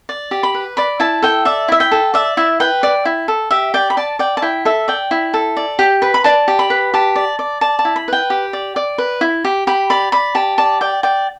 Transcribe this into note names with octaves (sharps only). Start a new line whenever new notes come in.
D5
G4
B5
B4
D5 B5
E4 A5
A4 G5
D5 E5
E4 E5
G5
A4
D5 E5
E4 E5
B4 G5
D5
E4
A4
G4 E5
D5 G5
B5
D5 A5
D5 G5
A5
E4 G5
A4 E5
D5 G5
E4
A4
D5
G4
B4
B5
D5 A5
G4
B5
B4
G4 A5
D5
D5
D5 A5
A5
E4
B5
B4 G5
G4
D5
D5
B4
E4
G4
G4 B5
D5 B5
D5 B5
G4 A5
D5 A5
D5 G5
D5 G5